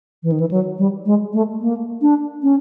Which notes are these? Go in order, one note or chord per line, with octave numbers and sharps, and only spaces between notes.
E3
D#3
E3
F#3
G3
G#3
A3
A#3
D4
C#4